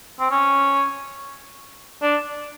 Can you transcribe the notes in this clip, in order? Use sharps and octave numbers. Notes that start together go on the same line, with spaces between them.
C4
C#4
D4